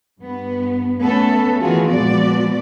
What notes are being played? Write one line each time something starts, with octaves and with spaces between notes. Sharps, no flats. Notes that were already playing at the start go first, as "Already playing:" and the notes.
G2 B3
A3 B3 C#4 A4
D#3 E3 B3 F4 F#4 G#4
A#2 F3 G#3 B3 F#4 D5